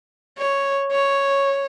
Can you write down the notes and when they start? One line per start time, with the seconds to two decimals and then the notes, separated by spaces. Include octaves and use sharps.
0.38 C#5
0.92 C#5